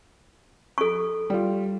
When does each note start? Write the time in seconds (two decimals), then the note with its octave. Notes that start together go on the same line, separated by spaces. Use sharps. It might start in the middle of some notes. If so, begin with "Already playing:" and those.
0.78 A4 C#6
1.30 G3 F4